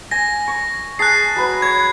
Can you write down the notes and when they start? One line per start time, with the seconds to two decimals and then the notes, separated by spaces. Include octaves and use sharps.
0.11 G#5 A#6
0.48 C#6
0.99 G#4 A5 F#6 C7
1.36 F#3 B4
1.62 C#5 G#6